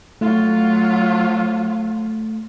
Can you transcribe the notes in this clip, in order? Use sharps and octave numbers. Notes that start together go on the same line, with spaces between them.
F#3 A3 F4